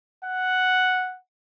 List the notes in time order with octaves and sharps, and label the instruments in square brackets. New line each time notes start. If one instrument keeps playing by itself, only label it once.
[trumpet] F#5